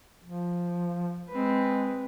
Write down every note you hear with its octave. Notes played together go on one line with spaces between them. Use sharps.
F3
G#3 C4 B4